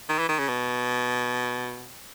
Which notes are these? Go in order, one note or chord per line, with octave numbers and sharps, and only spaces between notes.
D#3
E3
D#3
C#3
B2